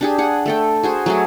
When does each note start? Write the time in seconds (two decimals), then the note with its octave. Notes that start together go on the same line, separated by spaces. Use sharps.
0.01 D4 G4 G#4
0.18 G#4 F#5
0.46 A3 A4 G5
0.83 F#4 G#4 C5
1.06 F#3 A3 G#4